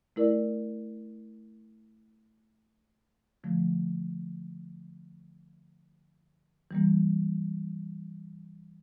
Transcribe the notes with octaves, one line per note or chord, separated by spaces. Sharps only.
A3 E4 A#4 D5
D3 F3 A3
E3 G3 A#3